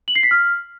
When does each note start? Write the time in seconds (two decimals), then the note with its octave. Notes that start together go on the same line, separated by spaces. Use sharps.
0.08 F#7
0.16 C7
0.23 B6
0.31 F6